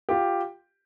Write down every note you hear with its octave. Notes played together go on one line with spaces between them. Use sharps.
F4 G4